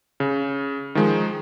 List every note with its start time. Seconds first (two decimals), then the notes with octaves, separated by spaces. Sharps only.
0.20 C#3
0.95 D#3 F3 G#3